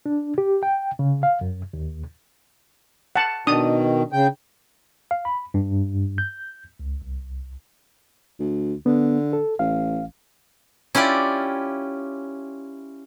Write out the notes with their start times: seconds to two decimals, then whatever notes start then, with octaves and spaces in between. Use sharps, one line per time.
0.06 D4
0.38 G4
0.63 G5
0.99 C#3
1.23 F5
1.41 F#2
1.73 D#2
3.16 F#5 A5
3.47 B2 D#3 D4 D#6
4.13 C#3 G5
5.11 F5
5.25 B5
5.54 G2
6.18 G6
6.80 C#2
7.02 C2
8.39 D2
8.86 D3 B3
9.33 A4
9.59 A1 F5
10.95 C#4 E4 F4 G4 D5